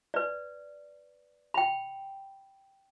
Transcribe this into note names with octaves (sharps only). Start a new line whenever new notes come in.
B4 D5
G5 B5